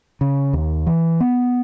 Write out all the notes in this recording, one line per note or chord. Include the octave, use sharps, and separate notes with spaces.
C#3
D#2
E3
B3